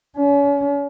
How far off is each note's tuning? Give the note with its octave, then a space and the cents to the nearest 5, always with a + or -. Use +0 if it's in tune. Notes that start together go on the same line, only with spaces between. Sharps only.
C#4 +35